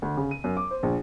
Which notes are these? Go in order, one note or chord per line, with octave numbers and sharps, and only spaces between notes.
D2
C#3
D#7
F#2
D6
C5
A#1